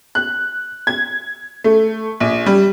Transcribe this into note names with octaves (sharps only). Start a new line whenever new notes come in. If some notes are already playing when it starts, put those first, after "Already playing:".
F#6
G#6
A3
A#1
G3